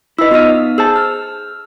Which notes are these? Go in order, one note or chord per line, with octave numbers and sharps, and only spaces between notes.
E4 B4 D#5 E6
B3 D#4 F4 D#5 F6
G#4 C5 A5 E6
F6